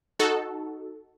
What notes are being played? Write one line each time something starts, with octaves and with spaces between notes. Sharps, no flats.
D#4 F#4 A4